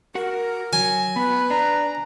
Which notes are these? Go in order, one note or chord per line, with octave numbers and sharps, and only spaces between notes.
F#4 A#4 F#5
F#3 G#5
B3 B4 B5
D4 A#5